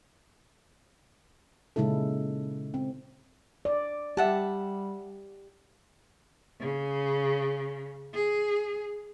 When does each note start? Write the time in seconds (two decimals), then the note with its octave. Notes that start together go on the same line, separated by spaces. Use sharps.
1.76 A#2 C#3 G#3 D#4 E4 A4
2.74 C4
3.65 D5
4.17 G3 G4 E5 F#5 A5
6.60 C#3
8.13 G#4